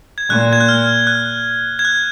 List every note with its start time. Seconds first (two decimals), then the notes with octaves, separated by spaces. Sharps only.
0.18 G#6
0.29 A#2 F#6
0.53 G#6
0.60 F#6
0.68 F6
1.07 F#6
1.79 G#6
1.85 F#6